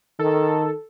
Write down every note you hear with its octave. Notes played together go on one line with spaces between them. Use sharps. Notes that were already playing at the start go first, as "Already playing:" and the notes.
D#3 A4